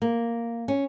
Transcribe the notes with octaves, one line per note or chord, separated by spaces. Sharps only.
A#3
C#4